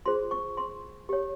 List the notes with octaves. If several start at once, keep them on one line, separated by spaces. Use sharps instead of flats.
F4 G#4 C5 C6
C#6
C6
G4 C#5